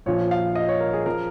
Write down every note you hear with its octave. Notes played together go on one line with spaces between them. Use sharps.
A#1 A#2 F3 C#5
F5
D#5
C#5
A#4
G#4
F3 A#4